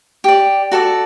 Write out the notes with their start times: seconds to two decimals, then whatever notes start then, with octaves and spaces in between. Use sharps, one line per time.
0.24 G4 D5
0.72 F#4 A4 D5